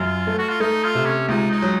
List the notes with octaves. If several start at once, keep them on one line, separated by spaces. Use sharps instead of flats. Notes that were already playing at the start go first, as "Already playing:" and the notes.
Already playing: F#2 F4
A3
F#4
F4
A3 D#4
F4
C3
C#4
C#2 D#4
D#4
F#3